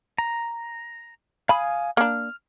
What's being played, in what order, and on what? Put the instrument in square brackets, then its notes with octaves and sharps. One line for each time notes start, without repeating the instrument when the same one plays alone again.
[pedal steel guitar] A#5
[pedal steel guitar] F5 G#5 D#6 [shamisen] B5
[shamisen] A#3 D4 [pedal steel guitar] F6